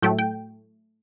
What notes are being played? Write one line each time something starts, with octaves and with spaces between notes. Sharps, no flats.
A2 F#3 A3 G5
G5